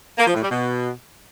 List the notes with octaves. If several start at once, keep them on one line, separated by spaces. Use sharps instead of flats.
A#3
F3
A2
G3
B2